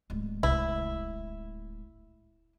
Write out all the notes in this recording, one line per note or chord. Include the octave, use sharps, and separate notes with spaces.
D1 G#3
C2 E4